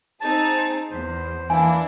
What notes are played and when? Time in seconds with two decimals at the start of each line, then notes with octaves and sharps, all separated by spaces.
0.21 C4 D#4 G#4 A5
0.91 E2 C5
1.50 E3 A#3 D4 E4 G#5